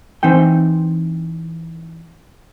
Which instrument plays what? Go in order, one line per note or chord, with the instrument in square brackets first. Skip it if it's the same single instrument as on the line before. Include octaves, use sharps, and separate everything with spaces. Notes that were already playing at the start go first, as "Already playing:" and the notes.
[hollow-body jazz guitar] E3 C4 D#4 G5